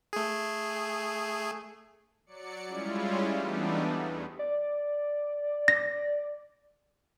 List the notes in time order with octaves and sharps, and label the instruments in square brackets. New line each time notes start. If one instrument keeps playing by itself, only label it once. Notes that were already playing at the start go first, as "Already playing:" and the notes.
[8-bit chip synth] A3 G#4
[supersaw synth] F#3 D5 C#7
G3 G#3 C#4 E4 F4
E3 G3 A3 B3 D4 D#4
E2
[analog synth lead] D5
[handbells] A#6